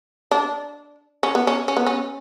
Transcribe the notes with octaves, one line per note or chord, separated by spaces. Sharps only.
D4
C#4
B3
C#4
C#4
B3
C#4